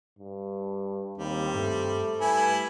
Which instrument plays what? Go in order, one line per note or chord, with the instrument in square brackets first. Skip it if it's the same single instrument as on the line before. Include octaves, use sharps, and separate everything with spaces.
[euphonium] G2
[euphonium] D#2 [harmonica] G3 [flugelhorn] C4
[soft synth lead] G2 [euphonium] A3
[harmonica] G3 E4 [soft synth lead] B4 [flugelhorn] G#5